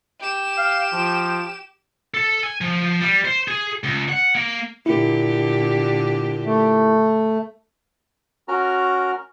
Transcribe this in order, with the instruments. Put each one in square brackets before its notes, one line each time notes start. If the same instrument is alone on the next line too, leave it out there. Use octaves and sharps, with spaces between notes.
[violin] G4 E7
[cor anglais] F5
F3
[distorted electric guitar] A4
G#5
F3
G3
C5
G#4
C#2
F#5
A#3
[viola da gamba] A#2 D3 G4 [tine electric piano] E4 A#4
[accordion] A3
[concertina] C#4 F#4 A#4 A#5 F6